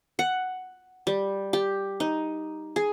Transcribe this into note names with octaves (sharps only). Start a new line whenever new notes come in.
F#5
G3
G4
D#4
G#4